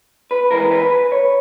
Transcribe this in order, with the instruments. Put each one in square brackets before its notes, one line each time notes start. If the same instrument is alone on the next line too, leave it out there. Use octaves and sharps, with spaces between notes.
[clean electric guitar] B4
G#2 E3 G#3 A#4
B4
B4
C#5